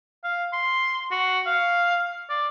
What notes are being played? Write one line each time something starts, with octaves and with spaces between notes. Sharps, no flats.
F5
C6
F#4
F5
D5